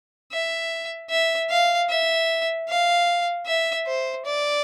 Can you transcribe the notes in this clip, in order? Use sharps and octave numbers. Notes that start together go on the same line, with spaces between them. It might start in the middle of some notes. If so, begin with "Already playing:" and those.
E5
E5
F5
E5
F5
E5
C5
D5